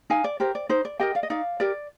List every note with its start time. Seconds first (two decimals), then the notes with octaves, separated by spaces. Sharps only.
0.10 D#4 F5 G#5
0.24 D5
0.40 G4 A#4 C5
0.55 D5
0.69 D#4 C5
0.85 D5
1.00 G4 A#4 D#5 G5
1.15 D5 F5
1.23 D#5
1.30 D#4 D5 F5
1.60 G4 A#4 D5